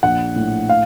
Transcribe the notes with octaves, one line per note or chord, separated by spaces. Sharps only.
A#1 F#5
A2
F5